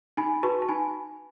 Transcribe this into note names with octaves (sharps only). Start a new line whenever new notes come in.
D#4 G#5 B5
F#4 B4 A5 C#6
A5
D#4 G#5 B5